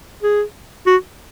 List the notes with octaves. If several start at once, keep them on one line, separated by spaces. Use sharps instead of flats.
G#4
F#4